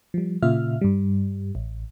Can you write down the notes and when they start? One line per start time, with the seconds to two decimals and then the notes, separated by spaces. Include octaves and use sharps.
0.14 F3 G3
0.42 A#2 C#3 F4 E5 F6
0.81 G2 G3
1.55 A1